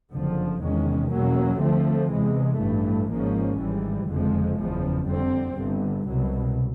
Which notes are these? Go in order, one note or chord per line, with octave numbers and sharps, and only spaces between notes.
F#1 F2 D3 F3
E2 C3 D#3 G#3 C#4
E2 B2 F#3 A#3 C#4
D2 D3 F3 A3 C4
E2 C3 E3 G#3
A1 G2 E3 A3
G#1 G#2 F3 A#3 C#4
G#1 G#2 E3 G3
F#1 F2 D3 F3 G#3
F#1 E2 C#3 F3
F2 D3 G3 C4
G1 G2 D3
C2 B2 F#3